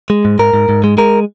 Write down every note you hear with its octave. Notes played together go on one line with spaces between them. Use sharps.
G#3
G#2
G#2 A#4
G#2
G#2
G#3
G#3 A#4